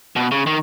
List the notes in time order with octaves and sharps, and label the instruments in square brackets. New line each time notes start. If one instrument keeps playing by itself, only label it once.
[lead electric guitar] B2
C#3
D#3